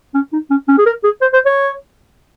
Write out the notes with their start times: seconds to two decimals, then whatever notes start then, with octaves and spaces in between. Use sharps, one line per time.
0.15 C#4
0.33 D#4
0.51 C#4
0.68 C#4
0.78 G#4
0.86 A#4
1.04 G#4
1.21 C5
1.33 C5
1.46 C#5